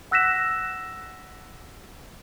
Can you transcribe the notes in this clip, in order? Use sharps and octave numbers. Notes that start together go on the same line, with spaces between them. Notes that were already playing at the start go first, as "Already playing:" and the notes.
F#5 E6 F#6 A#6 B6 E7